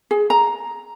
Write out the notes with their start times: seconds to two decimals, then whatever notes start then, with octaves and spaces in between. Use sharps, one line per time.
0.11 G#4
0.30 A#5